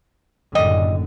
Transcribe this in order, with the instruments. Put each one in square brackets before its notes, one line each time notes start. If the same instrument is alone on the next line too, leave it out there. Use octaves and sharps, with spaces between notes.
[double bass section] F#1 A2 D3 [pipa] G3 D#5